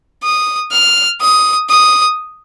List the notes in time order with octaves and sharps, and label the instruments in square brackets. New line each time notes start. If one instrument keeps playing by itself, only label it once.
[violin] D#6
F6
D#6
D#6